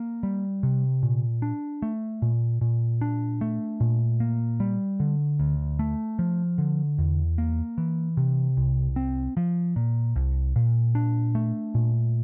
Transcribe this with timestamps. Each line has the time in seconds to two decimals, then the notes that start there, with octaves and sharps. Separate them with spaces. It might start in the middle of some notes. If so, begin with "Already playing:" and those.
Already playing: A#3
0.23 G3
0.63 C3
1.03 A#2
1.42 D4
1.82 A3
2.22 A#2
2.61 A#2
3.01 D4
3.41 A3
3.80 A#2
4.20 A#3
4.60 G3
5.00 D3
5.40 D2
5.79 A3
6.19 F3
6.58 D3
6.98 E2
7.38 A#3
7.78 E3
8.17 C3
8.57 C2
8.96 C4
9.37 F3
9.76 A#2
10.16 C2
10.56 A#2
10.95 D4
11.35 A3
11.75 A#2